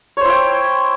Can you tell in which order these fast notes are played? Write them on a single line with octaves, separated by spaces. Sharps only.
C#5 C5 E4 G5